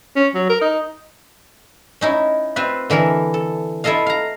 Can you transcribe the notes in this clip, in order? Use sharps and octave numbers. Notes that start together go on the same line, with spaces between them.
C#4
F#3
A#4
D#4
C#4 D#4 E4
C4 F4 B4 E5
D3 E3 E4 A#4
A4
E4 F4 A4 D#5 F5
F5 A#5